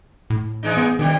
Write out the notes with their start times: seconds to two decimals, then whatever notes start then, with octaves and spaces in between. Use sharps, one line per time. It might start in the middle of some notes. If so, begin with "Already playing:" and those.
0.30 A2
0.63 E3 G#3 D#4
0.77 B3
0.99 F#2 B2 D#3